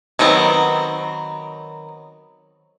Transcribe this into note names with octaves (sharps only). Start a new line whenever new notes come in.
D#3 F#3 B3 C4